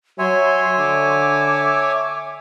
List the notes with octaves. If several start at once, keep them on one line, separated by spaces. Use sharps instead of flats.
F#3 C#5 E5 G#5 C6
D3 D6